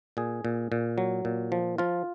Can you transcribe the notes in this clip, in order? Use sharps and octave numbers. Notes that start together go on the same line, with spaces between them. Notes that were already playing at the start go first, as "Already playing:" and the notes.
A#2 G#4
A#2
A#2
F#3
A#2
F3
F3 F4